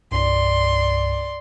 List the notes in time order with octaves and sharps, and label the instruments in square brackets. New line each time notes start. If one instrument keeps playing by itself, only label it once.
[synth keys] C2 G2 [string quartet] D5 C6